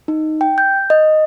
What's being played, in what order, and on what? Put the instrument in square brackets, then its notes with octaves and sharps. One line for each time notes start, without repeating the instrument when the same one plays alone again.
[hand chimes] D#4
G5
G6
D#5